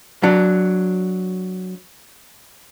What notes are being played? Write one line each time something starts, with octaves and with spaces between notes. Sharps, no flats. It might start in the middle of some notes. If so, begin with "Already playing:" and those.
F#3 D4